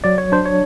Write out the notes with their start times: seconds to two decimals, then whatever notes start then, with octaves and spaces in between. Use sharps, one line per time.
0.04 F#3 D5
0.18 C#5
0.32 D4 C5
0.46 C#5